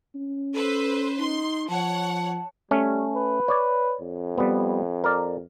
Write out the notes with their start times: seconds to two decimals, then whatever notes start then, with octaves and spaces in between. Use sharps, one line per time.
0.15 C#4
0.54 A4 B4 C5
1.18 D#4 C6
1.70 F3 C#5 F#5 A5
2.71 G3 A3 C#4
3.15 B4
3.48 C#5 D5
4.01 F2
4.38 G3 B3
5.04 A#4 D5